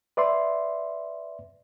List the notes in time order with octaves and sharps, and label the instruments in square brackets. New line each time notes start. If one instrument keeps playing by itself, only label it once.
[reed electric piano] B4 D5 E5 C6